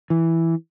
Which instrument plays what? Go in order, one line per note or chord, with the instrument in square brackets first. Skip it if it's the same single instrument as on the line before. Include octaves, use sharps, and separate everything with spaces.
[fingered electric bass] E3